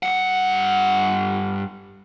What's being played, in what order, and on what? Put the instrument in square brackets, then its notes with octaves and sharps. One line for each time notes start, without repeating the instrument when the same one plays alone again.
[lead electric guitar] G2 F#5